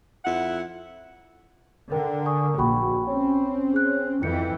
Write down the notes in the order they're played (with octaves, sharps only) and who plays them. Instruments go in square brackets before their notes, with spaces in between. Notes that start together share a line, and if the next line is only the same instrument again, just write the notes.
[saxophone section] F2 E4 F#5
[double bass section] D3 [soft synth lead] A#4 [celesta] G5
[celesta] G#5 C#6 D#6
[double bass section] A#1 [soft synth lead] F#4 [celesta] G5 B5 C#6
[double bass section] C4 [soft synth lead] C#4
[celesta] G#4 F#6
[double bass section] F2 E3 [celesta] E4 C#7 [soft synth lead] G5